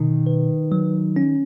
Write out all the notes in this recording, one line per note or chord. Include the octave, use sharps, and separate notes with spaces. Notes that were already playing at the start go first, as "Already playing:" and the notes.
Already playing: B2 D#3
B4
F#3
C#4